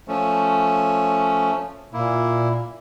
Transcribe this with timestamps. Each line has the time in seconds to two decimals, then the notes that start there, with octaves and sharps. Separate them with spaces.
0.08 F3 A3 C#4
1.93 A#2 A#3 E4